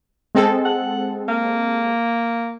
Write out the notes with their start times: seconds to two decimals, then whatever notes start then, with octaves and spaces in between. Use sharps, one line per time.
0.35 G#3 C4 A4
0.65 F#5
1.28 A#3